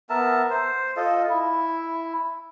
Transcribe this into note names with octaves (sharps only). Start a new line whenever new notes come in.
B3 A#4 E5 A5
C5
F4 A4 D#5
E4